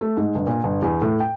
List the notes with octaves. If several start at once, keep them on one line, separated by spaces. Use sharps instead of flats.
A3
G#2
G1
A#2
G1
E2
A2
G5